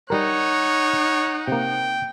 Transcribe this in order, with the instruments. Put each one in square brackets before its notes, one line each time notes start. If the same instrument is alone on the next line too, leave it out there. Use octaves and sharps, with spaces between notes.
[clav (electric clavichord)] G3 A#4 [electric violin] D#4 F#5 [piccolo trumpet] C#5
[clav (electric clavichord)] C3 A#3 [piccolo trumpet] G5